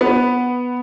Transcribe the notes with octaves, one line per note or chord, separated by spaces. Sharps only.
B3